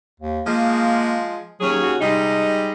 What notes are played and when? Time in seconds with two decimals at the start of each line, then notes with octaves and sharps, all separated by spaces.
0.20 D#2
0.47 F3 G#3 A#3
1.60 D#2 F#3 C#4 G#4
1.82 F#4
2.00 C3 G3 G#3 D#4